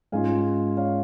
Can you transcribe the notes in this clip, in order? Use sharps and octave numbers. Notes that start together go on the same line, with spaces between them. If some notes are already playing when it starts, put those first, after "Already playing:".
G#2 G#3 C#4 F4 F5 G#5
C#5 F5